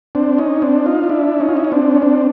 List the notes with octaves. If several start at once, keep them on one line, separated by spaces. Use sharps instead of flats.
C4 D4
C#4 D#4
C4 D4
D#4 F4
D#4
D4 E4
C#4 D#4
F4
E4
D#4
C4 D4
C#4
C4 D4